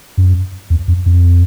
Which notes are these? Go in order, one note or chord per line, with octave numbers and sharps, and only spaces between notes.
F#2
E2
F2
F2